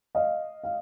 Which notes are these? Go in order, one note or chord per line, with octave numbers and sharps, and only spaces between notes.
D#5 F5
F5